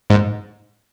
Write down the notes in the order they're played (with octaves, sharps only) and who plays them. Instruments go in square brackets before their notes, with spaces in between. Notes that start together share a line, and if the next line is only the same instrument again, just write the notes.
[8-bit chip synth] G#2